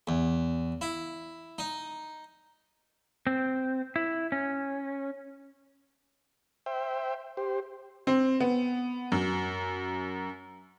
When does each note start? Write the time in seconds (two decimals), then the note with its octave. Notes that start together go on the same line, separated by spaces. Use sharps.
0.07 E2
0.81 E4
1.58 D#4
3.27 C4
3.96 E4
4.32 C#4
6.66 C5 E5 G5
7.37 G4 C5
8.07 C4
8.40 B3
9.12 F#2